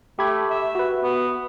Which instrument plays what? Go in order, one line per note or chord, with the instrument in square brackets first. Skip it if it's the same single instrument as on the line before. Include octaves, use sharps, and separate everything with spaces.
[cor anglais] A3 [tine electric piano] G4 B5 G#6
[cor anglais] E5
[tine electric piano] F#4 B4
[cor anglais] B3